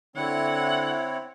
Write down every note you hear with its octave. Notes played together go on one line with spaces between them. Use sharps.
D3 C4 E4 C#5 F#5